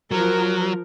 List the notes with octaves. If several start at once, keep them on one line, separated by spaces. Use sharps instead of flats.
F3 F#3 A#4